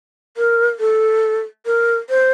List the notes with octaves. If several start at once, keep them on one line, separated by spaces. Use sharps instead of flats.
A#4
A4
A#4
C5